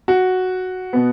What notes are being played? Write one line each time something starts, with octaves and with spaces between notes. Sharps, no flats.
F#4
B2 B3